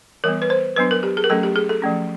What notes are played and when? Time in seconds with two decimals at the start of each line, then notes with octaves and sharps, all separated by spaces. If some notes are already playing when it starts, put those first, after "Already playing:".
0.24 E3 G3 B3 A#4
0.42 B4
0.50 C5
0.76 F#3 B3 D4 B4
0.91 A#4
1.03 G4
1.17 G#4
1.24 A#4
1.30 F#3 A3 C#4 A4
1.43 G4
1.56 G#4
1.69 A4
1.82 F3 A3 C#4